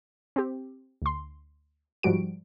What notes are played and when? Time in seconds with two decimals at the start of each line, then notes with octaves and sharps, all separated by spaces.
0.36 C4 G4
1.02 D2 C6
2.03 G#2 F3 G3 F#4 D7